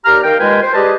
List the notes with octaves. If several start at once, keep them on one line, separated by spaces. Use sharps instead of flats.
D#2 G4 D5 A#5 F6
D#3 A#4 F5 G5
D#2 G#3 F4 B4 G5 G#5
C5
G3 G4 G#4 B4 D#5 A5